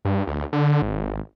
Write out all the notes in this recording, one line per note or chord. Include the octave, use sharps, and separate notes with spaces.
G2
D2
D3
G#1